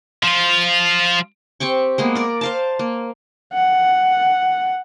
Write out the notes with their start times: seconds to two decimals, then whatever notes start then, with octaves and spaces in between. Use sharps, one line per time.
0.23 F3 F4
1.60 C4 G4 G5 C#6
1.98 G#3 A#3 B3
2.15 A#4 D5
2.41 C5 F5 A5
2.79 A#3
3.53 F#5